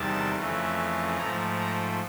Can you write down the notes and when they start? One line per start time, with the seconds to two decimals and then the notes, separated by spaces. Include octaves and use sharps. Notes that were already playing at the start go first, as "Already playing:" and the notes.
Already playing: E2 C3 D#3 G3 A5
0.35 F2 C#3 E3 A3
1.17 G#2 F3 A3 A#5
1.59 A#5